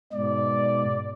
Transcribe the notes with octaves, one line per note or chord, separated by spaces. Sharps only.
G#2 B2 D5